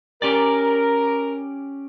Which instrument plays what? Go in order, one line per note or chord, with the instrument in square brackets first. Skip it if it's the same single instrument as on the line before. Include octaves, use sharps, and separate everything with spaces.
[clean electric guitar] C#4 G4 D5 [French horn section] A#4